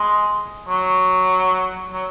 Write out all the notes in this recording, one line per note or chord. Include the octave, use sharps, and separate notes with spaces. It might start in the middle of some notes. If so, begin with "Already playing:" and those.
Already playing: G#3
F#3
F#3